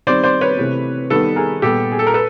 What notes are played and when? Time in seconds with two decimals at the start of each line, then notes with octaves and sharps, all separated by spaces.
0.07 D#3 G3 C4 C5 D5
0.24 C5 D5
0.41 B4 C#5
0.59 C3 E3 A3 C4
1.10 D#3 G3 B3 A4 B4
1.36 G#4 A#4
1.62 A#2 G3 B3 G4 A4
1.92 G#4
1.99 A4
2.07 A#4
2.14 A4 B4